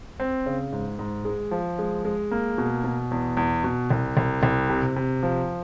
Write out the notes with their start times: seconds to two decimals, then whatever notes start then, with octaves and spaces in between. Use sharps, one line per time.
0.20 C4
0.46 C#3
0.72 G#2
0.99 G#2
1.25 G#3
1.51 F3
1.79 G#3
2.05 G#3
2.31 A#3
2.58 B2
2.84 B2
3.11 E2
3.37 E2
3.64 B2
3.90 C2
4.17 C2
4.43 C2
4.70 C3
4.96 C3
5.23 F3